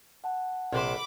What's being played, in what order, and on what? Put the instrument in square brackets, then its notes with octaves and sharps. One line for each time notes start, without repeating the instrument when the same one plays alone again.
[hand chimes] F#5 A5
[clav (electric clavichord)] A#1 [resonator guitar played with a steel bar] C3 G3 C5 [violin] B5 D6